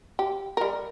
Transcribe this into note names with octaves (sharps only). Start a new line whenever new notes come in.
G4
G3 A#4